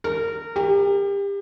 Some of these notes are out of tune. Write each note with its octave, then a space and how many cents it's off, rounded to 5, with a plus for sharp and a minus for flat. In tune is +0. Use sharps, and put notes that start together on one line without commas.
A#4 -20
G4 +30